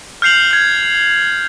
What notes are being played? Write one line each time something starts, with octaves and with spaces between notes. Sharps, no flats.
F6 G6 C7 F7 F#7
F6 G#6